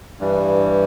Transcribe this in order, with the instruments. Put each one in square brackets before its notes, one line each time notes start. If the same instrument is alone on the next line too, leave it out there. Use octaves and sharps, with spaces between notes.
[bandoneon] G2 E3 G3